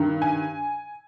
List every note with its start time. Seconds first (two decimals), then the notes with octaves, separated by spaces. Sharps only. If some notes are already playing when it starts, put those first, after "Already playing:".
Already playing: G2 D#3
0.22 G#5